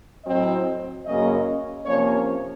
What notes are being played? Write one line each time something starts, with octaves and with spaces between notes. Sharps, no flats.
A2 F#3 C4 D#5
F#2 C#3 F#3 A#3 C#4 D#5
C3 F3 A#3 C#4 C#5